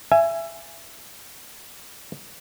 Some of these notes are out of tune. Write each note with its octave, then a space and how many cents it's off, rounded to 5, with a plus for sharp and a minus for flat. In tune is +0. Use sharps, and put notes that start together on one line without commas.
E5 +25 G#5 +0